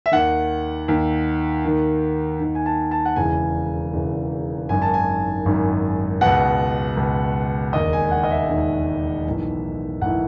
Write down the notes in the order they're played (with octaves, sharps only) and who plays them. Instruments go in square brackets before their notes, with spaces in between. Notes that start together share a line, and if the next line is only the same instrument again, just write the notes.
[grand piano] E5
D#2 D#3 F#5
D#2 D#3
D#2 D#3
D#2 D#3
G#5
A5
A5
F#5
E1 E2 C#3 E3 G#5
E1 E2 C#3 E3
G#1 F#2 D#3 G#5
A5
G#5
G#1 F#2 D#3
C#2 B2 F#5
C#2 B2
E1 D#2 D#3 D#5
G#5
F#5
D#5
E5
E1 D#2 D#3
B1 A2 E3
B1 A2 E3 F#5